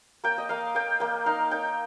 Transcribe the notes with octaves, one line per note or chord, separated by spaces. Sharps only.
A#3 G5
D#5
A#3 F5
A#3 G5
A#3 G5
D#4 F5
D#4 G5